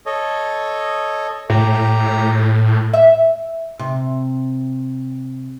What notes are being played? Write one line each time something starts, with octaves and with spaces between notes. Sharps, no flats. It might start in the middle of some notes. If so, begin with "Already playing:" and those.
A4 C#5 D#5
A2 G4 A#5
E5
C3